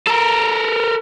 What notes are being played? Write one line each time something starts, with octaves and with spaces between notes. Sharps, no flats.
A4 A#4